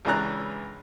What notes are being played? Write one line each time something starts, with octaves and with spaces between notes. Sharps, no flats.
C#2 C#3 E3 D4 A#5 F#6